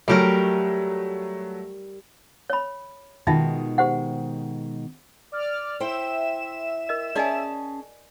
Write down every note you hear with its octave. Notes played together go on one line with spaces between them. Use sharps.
F#3 G3 A3 G4 A#4
C#5 B5
B2 D#3 G#3 D#4 F4 E5
G4 C5 F#5
D5 F6
E4 C5 E5 G5 E7
A#4 D#5
C#4 G#4 D5 D#5 G#5 A5